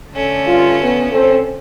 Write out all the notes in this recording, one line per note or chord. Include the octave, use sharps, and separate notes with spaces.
D3 A3 C#4
G2 F4
B3
C4 A4 C5